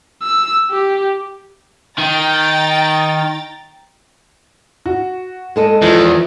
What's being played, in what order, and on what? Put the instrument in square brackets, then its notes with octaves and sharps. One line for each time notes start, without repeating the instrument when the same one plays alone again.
[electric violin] E6
G4
[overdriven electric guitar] D#3 [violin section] G5 A#5 A6
[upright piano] F#4
[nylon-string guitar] G#3 A4 D#5
[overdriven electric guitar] E2 [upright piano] E3 F3